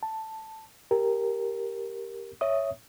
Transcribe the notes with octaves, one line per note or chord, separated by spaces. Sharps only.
A5
G4 A#4
C#5 E5 D#6